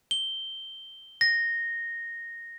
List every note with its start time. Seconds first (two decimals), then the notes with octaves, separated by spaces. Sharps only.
0.11 G7
1.21 A#6